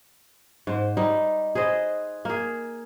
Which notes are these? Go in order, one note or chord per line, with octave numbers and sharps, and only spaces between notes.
G#2 C5
G3 D#4
G#4 B4 C5 D#5
A#3 G#4